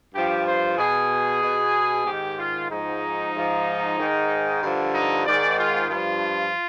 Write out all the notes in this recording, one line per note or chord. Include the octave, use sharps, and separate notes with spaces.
G2 F3 G4
C5
B2 G#4
B2
G#2 D#3 G4
F4
G#2 F3 D#4
G#2 F3
G#2 D#3
G2 D3 F3
D#4
G#2 D#3 D5
F4
G2 F3 F4